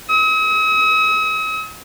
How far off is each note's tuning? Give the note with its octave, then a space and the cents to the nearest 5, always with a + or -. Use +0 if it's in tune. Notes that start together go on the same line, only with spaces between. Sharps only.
D#6 +45